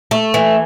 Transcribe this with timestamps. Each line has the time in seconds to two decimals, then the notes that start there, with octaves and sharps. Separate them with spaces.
0.11 A3
0.34 E3